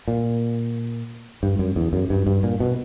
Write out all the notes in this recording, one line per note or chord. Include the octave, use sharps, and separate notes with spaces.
A#2
G2
F#2
E2
F#2
G2
G2
A#2
B2